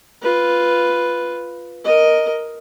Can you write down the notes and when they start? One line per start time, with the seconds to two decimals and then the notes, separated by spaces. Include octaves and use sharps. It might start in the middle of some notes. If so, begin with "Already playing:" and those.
0.22 F4 B4
1.85 A#4 D#5